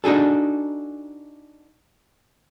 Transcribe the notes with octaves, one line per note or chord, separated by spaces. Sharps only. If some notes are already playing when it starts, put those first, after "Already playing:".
D4 D#4 F#4 G#4 A4